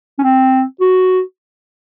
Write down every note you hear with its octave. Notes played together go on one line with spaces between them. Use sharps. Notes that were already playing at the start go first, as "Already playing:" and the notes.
C#4
C4
F#4